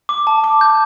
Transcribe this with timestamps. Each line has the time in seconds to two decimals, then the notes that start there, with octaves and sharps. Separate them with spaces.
0.09 D6
0.27 A5
0.44 D6
0.61 G6